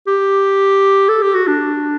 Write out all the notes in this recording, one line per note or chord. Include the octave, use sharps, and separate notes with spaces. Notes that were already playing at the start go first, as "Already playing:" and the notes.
G4
A4
G4
F#4
D4